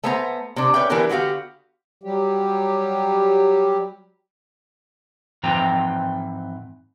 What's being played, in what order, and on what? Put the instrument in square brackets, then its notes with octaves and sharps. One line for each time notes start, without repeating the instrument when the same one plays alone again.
[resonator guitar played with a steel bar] A3 B3 C5 G#5 A#5
C3 D4
C#4 B4 D5 E5 G5
E3 B3 D4 G4 A#4 B4
D3 B3 F#4 G4 F5
[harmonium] F#3 G3 G4
[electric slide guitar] G#2 E3 F3 C4 G5 A#5